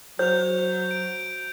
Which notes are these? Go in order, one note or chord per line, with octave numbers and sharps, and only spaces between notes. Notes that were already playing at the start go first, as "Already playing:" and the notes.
F#3 C5 G6 F7
D7